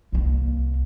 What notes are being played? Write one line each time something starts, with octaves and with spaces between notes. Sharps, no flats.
C2 A#3